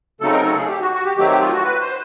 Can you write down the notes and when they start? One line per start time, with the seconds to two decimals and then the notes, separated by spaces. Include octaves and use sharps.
0.21 C#3 F#3 A3 C4 D#4 A4
0.33 A#4
0.45 A4
0.57 G#4
0.68 G4
0.81 F#4
0.93 F#4
1.05 G4
1.17 D#3 F#3 A3 C4 G4
1.29 G4
1.40 F4
1.53 F#4
1.64 B4
1.80 C5